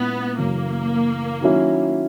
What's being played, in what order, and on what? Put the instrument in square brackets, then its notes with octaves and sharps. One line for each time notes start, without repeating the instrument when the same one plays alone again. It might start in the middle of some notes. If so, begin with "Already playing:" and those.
Already playing: [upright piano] A#2 G#3 C#4 E4 [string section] B3
[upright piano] F#2 C#3 E3 [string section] A#3
[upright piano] D#3 F#3 C#4 E4